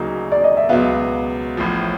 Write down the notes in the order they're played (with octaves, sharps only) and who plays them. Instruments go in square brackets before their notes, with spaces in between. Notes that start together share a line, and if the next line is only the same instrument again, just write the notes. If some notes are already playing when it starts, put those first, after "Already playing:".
Already playing: [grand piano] D2 C#3 F#3 A#3 D#4
[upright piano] D5
D#5
E5
[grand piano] C#2 B2 F#3 B3 [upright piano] F5
[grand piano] A1 A2 F3